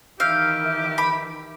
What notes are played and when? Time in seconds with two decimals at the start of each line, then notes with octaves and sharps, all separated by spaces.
0.20 D#3 E3 G4 E5 F5 E6 F6 G6
0.98 B5 D6